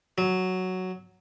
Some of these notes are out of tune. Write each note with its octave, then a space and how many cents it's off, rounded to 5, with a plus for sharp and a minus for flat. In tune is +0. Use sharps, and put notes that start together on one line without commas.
F#3 +0